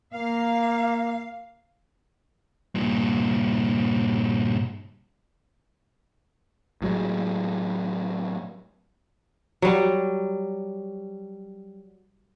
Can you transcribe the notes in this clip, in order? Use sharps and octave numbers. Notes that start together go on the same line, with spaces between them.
A#3 F5
G2 A#2
A2 F#3 G#3
F#3 G3